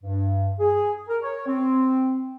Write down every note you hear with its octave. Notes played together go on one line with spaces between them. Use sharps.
G2
G#4
A#4
C#5
C4